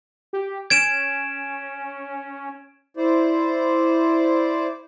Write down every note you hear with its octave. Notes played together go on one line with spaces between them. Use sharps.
G4
C#4 G#6 D7 E7
E4 C5 D5